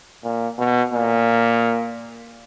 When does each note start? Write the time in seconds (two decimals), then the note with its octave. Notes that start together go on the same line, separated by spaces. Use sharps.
0.24 A#2
0.58 B2
0.94 A#2